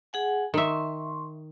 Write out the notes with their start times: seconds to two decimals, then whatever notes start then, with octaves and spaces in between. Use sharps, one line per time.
0.13 G#4 F#5 G#5
0.54 D#3 E5 C6 C#6